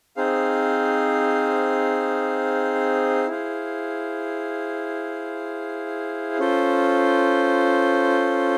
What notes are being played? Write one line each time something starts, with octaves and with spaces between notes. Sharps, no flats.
C4 D#4 G#4 C5 F5
E4 G#4 C5 F5
C#4 F4 A4 C5